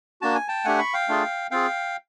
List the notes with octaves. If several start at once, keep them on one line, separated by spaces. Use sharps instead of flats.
A#3 D4 F#4 A5
G#5
G5 A5
A3 D4 G4 F#5 G#5
B5 C#6
F5 G5
A3 D4 F4 G#4
C4 F4 G#4 F5 G5